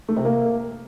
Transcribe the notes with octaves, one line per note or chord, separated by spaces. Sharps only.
A3
C3
A#3